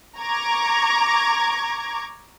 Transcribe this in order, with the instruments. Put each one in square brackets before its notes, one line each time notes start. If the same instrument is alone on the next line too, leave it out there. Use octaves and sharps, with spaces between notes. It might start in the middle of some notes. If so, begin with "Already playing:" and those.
[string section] A#5 C#6 D6 G#6